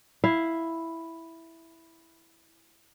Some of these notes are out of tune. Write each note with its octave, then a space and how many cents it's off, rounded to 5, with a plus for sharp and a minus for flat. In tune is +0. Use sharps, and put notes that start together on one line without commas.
E4 +0 F5 +0